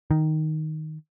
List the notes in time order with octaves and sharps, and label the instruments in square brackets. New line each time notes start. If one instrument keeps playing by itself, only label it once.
[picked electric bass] D#3